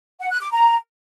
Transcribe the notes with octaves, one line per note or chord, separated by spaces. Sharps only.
F#5
F#6
D6
A#5